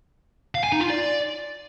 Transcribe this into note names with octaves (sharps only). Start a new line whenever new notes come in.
F5
G#5
D#4
F4
D5